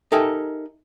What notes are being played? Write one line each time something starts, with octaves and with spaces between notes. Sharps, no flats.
D#4 G4 A4 A#4 E5 G#5